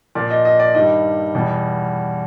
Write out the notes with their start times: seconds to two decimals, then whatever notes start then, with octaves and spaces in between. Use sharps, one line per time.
0.15 A#2 F3 D5
0.30 D#5
0.45 D#5
0.60 D5
0.75 G2 D#3 G3 D#5
1.35 E2 B2 G3